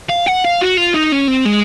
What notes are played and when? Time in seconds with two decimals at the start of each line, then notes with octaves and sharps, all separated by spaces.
0.10 F5
0.27 F#5
0.44 F5
0.61 F#4
0.77 F4
0.94 D#4
1.12 C#4
1.28 C4
1.45 G#3